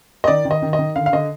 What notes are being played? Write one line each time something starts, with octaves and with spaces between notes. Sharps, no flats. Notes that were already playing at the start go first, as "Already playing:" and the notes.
D#5
D#3 D5
D#3
D#5
D#3
D#5
D#3
D3 F5
F5
D3 D#5